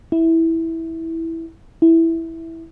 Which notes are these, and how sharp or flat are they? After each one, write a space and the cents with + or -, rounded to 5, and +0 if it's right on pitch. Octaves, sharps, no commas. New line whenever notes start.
E4 -10
E4 -5